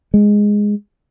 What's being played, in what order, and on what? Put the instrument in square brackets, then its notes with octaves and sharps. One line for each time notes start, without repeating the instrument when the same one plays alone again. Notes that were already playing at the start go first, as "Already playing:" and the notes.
[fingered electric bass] G#3